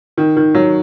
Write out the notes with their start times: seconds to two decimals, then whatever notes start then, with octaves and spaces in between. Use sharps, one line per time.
0.18 D#3
0.37 D#3
0.54 F#3